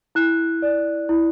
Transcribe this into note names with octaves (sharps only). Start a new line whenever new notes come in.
E4 F#6
D5
E4